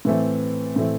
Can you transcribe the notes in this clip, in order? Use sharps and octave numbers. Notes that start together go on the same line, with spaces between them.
A2 E3 A3 C4
A2 E3 A3 C4